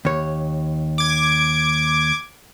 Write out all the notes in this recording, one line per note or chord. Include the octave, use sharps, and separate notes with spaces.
D#2 C#5
D6 G#6